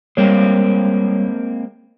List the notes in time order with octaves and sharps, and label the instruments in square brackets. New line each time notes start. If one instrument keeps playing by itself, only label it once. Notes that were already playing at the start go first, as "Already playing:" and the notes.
[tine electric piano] G3 C#5 [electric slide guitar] G#3 A#3 C4